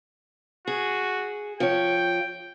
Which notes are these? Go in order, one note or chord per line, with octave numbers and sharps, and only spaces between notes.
F#4 G#4
F3 C#5 G5